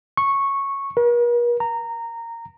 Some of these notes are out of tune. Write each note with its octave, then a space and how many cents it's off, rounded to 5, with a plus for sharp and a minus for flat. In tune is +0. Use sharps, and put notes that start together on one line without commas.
C#6 -10
A#4 +45
A#5 -15